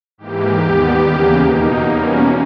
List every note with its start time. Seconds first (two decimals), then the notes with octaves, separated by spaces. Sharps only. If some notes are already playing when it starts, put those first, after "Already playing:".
0.18 G#2 E3 A#3 G4
0.61 D#2 D#3 G3 B3
1.03 E2 C#3 E3 A#3
1.45 B2 A#3 D#4
1.88 E2 B2 G3 A#3 C#4